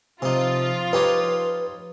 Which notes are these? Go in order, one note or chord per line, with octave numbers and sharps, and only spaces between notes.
C3 F3 D#4 F4
D#4 G4 B4 C#5